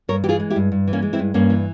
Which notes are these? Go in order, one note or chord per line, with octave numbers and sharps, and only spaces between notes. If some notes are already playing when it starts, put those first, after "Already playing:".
G2 A#4 C#5
E3 G4
F4 G#4
G#3
E4 G4
G2
G2
E3
A#3 C#4
G#3
C4 E4
G2
G2 A#3 C#4
E3